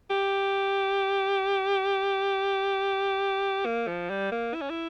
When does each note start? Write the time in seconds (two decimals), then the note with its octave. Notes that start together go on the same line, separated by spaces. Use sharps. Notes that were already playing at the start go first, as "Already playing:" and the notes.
0.10 G4
3.66 A#3
3.88 F3
4.10 G3
4.32 A#3
4.54 E4
4.61 C#4
4.70 E4